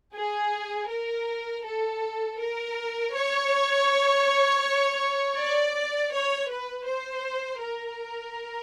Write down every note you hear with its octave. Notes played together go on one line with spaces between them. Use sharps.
G#4
A#4
A4
A#4
C#5
D5
C#5
B4
C5
A#4